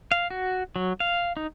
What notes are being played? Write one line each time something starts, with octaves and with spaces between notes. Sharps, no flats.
F5
F#4
F#3
F5
D#4